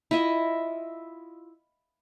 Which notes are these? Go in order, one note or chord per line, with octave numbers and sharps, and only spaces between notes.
E4 F4 D#5 E5